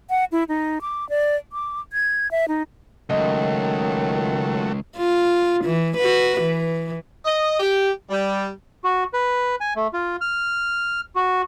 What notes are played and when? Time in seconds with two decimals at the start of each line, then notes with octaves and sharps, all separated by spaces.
0.10 F#5
0.32 E4
0.49 D#4
0.81 D6
1.09 D5
1.53 D6
1.93 G#6
2.31 E5
2.48 D#4
3.10 C#2 D#3 F#3 A3 D#5
4.97 F4
5.65 E3
5.97 F#4 B4
6.41 E3
7.25 D#5
7.60 G4
8.10 G3
8.84 F#4
9.13 B4
9.60 G#5
9.76 A3
9.93 F4
10.21 F6
11.16 F#4